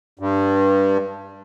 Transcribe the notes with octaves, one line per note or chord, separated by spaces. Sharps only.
G2